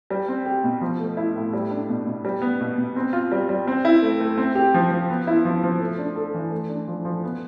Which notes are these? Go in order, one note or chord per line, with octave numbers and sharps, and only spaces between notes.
G3
C4
G4
B2
F3
A3
E4
A2
G3
D4
B2
B2
G3
B3
B2
B2
C4
F4
G3
G3
C4
E4
A3
A3
C4
G4
F3
F3
B3
E4
F3
F3
A3
D4
A4
E3
A3
D4
F3
F3
B3